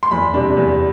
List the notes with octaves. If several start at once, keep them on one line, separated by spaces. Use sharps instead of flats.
C6
E2 B5
C3 G3 D4
E2